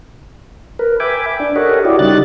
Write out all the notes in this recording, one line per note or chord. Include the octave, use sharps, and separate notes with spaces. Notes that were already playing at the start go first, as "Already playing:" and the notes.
A#4 B4
E5 G5 G#5 B5 D6
D4
G4 A4 A#4 C#5 D#5 F#5
E4 F#4 G4 D5
C#3 F#3 G3 D#4 F#6 A6